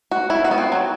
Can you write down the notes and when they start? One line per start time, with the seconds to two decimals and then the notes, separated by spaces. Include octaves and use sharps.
0.11 F#4
0.30 E4
0.44 F#4
0.51 B3
0.58 C4
0.72 F#3